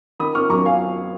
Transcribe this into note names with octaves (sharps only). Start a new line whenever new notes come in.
D#3 B5 D#6
D#3 C#6 F6
F#2 A#5 C#6
F5 G#5